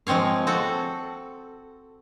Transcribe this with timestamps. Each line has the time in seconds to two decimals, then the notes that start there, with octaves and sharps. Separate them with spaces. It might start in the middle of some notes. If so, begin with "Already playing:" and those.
0.07 F3 G#3 C4 C#5 F5
0.47 C4 F#4 A4